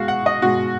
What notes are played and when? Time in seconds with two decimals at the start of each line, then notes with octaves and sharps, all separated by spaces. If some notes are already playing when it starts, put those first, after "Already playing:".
Already playing: B2 G#3 F#4 F5
0.08 F#5
0.26 D#5
0.42 B2 G#3 F#4